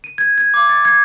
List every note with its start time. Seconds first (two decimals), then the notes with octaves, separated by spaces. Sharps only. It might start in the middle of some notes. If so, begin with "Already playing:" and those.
0.04 D#7
0.18 G#6
0.38 G#6
0.54 D6
0.69 A6
0.85 G#6